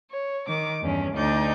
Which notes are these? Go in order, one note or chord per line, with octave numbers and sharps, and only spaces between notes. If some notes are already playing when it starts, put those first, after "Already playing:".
C#5
D#3 D6
E2 G2 C#4
D2 D#4 D5 G6